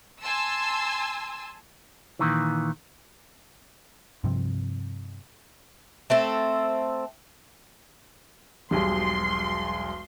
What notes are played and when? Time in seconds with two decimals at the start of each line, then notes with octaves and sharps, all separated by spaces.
0.21 G#5 A5 C6 E6
2.19 A#2 D#3 E3
4.24 G2 C3 F3
6.10 A3 C4 A4
8.71 E1 B1 G3 G#4 C6